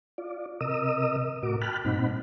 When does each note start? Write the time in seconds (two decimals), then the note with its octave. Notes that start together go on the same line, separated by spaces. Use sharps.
0.18 F4 D5
0.61 C3 A#4 D#5 D#6 E6
1.43 A2 F#4 A#4 D6
1.62 G5 A5 B5 F6 F#6
1.85 G2 A#2 C4 D#4 F#5 B5